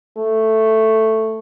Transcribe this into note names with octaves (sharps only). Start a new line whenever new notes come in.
A3